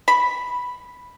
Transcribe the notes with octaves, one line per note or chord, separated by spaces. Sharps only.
B5